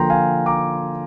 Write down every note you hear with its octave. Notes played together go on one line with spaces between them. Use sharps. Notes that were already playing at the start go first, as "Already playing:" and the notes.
Already playing: D3 F3 A#3 G5 A#5 C6
F5 G#5
A#5 D6